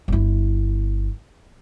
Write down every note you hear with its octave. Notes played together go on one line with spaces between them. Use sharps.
G1 E4